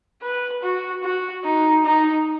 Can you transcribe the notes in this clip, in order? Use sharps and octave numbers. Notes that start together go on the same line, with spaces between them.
B4
F#4
F#4
D#4
D#4